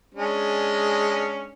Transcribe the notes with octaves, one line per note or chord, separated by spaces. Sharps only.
G#3 C#4 D4